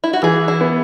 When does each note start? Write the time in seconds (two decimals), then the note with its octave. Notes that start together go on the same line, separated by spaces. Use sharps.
0.04 E4
0.13 F#4
0.23 E3 G#4
0.48 E4
0.61 B3